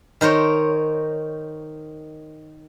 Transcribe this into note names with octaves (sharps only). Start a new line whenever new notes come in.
D#3 A#4 C5 C#5